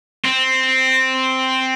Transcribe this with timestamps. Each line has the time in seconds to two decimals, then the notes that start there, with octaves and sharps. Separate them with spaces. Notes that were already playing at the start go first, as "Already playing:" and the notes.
0.25 C4